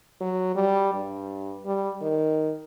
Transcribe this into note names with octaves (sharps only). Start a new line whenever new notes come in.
F#3
G3
G2
G3
D#3